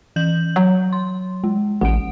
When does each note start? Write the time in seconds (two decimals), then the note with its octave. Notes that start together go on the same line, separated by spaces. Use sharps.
0.16 E3 G6 F#7
0.56 F#3
0.93 C6
1.44 G#3
1.81 A1 F#5 D7